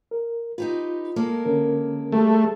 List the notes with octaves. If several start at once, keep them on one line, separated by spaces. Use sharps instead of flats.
A#4
D#4 F4 G4 B4
G#3 A#3 A4
D3 C#4 A#4
G3 A3 G4 G#4